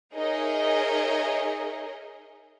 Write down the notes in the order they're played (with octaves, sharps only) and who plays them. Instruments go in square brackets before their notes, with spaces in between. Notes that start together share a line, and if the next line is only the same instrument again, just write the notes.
[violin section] D#4 G#4 A#4 C#5 D#5 E5